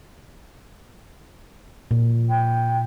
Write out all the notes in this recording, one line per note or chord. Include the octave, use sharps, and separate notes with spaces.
A#2
G5